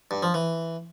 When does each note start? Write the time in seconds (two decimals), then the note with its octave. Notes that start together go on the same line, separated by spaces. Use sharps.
0.11 G2
0.23 F3
0.34 E3